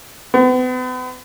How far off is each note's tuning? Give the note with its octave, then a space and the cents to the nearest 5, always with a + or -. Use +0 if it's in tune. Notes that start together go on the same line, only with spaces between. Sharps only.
B3 +40